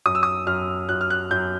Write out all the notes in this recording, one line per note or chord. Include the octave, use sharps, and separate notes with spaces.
F#2 D#6
E6
D#6
F#2 F6
F#2 F#6
F6
F#6
F#2 G6